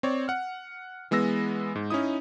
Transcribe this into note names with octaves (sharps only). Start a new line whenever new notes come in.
C4 C#5 D5
F#5 F6
E3 G#3 B3 E6 A#6
G#2
C#4 D#4 E4 D#6